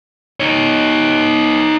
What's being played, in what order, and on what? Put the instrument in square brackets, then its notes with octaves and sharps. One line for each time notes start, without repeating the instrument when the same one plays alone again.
[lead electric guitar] D#4 C#5